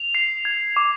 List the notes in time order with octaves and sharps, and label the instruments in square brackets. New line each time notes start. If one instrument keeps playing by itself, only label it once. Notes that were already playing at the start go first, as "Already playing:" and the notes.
Already playing: [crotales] F7
C7
G#6
D6